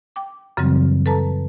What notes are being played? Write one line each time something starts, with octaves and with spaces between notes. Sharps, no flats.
G5 D6
F#2 C#3 E3 F#3 G3 C4
A4 B4 A5 A#5